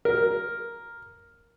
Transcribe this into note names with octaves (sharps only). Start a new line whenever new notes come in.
A#4